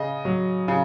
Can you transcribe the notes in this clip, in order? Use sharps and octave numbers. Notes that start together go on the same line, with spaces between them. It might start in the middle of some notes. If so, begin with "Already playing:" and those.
Already playing: C#3 D#5
F#3
C#3